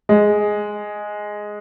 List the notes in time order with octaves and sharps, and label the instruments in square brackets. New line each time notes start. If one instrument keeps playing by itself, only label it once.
[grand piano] G#3